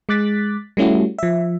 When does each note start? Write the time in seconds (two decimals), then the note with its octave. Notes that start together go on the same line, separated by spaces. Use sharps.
0.09 G#3 D6 F#6 A6 B6
0.77 G3 A3 C#4 E4 F#4
1.19 F3 E5